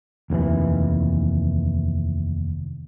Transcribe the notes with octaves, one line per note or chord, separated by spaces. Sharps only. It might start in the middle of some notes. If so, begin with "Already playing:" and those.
F1 D#2 G#2 E3